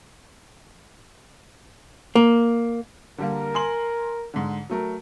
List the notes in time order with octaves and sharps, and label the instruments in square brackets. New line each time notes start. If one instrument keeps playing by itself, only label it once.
[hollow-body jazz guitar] A#3
[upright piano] D3 G3 A#3 [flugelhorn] A#4
[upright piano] G#5 C6 F#7
G#2 D3
F#3 A3 A#4